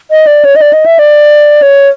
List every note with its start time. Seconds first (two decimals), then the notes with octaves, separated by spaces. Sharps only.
0.11 D#5
0.27 D5
0.45 C#5
0.56 D#5
0.62 D5
0.73 D#5
0.86 E5
0.99 D5
1.62 C#5